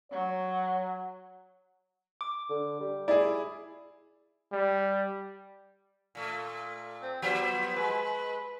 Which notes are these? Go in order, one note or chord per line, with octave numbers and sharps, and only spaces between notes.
F#3 C#5
D6
D3
G3
E4 G#4 D5
G3
A#2 A3
C4
F3 B3 G4 C5
G#3 B4